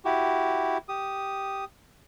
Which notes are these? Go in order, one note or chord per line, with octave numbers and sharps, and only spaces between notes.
E4 F#4 G4
G4 D#6